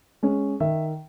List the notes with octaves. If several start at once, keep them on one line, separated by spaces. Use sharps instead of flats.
G#3 C#4
D#3 E5